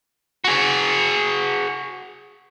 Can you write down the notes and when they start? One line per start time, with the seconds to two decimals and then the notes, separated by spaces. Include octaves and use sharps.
0.44 F#4 G#4